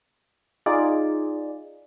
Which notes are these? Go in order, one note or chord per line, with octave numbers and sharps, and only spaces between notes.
D#4 F4 G#4 D5